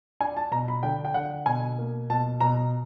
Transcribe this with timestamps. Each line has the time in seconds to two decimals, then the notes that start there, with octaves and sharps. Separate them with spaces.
0.20 D4 G#5
0.37 A5
0.51 B2 A#5
0.68 B5
0.83 D3 G5
1.05 G5
1.14 D3 F#5
1.46 B2 G#5
1.78 A#3
2.10 B2 A5
2.40 B2 A#5